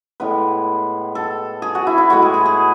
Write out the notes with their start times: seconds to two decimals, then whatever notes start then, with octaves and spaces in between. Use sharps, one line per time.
0.20 A2 G#3 B3 B4
1.15 A4
1.62 G#4
1.75 F#4
1.87 E4
1.98 E4
2.10 A2 G#3 B3 F#4
2.22 G#4
2.34 G#4
2.46 G#4